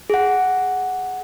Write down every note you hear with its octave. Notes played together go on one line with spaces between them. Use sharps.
G#4 F#5